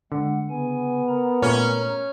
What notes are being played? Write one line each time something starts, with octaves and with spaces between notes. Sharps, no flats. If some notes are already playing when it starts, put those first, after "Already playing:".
D3 G#3 F#5
C#3 B3 G#5
A#4 A#5
A#2 A3 C#4